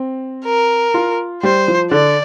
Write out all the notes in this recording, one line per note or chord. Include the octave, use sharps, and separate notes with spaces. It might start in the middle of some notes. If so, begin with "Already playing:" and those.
Already playing: C4
A#4
F4
G3 C5
F3
D3 D5